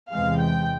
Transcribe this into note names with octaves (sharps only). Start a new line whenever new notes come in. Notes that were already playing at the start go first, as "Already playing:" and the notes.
E2 C3 E3 G#3 F5
G5